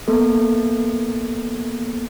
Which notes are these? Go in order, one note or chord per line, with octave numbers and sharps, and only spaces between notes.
A#3 B3 A4